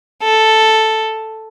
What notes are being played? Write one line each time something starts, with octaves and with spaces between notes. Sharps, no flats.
A4